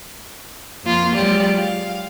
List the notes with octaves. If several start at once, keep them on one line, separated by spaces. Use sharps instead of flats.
F2 A#3 F4
F#3 G#3 F4 G4 D5
F5